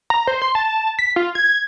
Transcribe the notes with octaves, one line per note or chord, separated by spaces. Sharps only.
A#5
C5
C6
A5
B6
F4
G#6